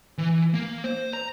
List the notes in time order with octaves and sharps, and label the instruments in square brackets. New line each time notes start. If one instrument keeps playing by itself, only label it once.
[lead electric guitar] E3
A#3
C5
A#5